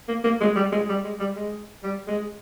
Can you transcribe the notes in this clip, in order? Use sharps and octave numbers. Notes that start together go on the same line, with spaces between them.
A#3
A#3
G#3
G3
G#3
G3
G#3
G3
G#3
G3
G#3